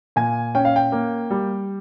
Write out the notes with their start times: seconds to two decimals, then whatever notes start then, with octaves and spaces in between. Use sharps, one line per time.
0.16 A#2 G#5
0.55 C#4 G5
0.65 F5
0.76 G5
0.92 A#3
1.31 G3